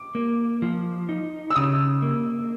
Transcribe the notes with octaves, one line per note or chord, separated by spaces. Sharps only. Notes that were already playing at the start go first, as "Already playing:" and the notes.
Already playing: D6
A#3
F3
D#4
E6
C#3 D#6
A#3